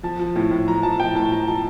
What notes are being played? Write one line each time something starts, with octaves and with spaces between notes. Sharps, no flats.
F3 A5
F3
A2
A2
F3 A#5
F3 A5
A2 G5
A2 A5
F3 A#5
F3 A5